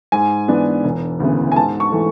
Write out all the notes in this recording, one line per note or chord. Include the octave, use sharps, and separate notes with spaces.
G#2 G#5
E3 B3 D4
E1
D2 C#3 E3 B3
G#5
G#2 A5
C#6
E3 A3